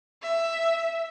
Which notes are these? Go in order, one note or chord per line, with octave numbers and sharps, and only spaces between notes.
E5